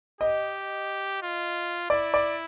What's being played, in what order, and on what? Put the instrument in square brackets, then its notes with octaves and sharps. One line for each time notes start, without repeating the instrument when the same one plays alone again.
[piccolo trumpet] G4 [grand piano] D#5
[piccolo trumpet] F4
[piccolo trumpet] E4 [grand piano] D5
[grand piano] D5